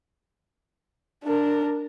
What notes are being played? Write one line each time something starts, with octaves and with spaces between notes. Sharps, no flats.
D4 A#4